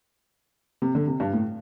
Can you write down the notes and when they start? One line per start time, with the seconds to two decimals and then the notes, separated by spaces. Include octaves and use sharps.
0.82 C3
0.95 D3
1.07 C3
1.20 G2
1.33 A2